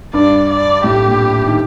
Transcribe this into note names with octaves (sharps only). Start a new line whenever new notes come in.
G2 D5
D5
A2 G4
A#2
D#3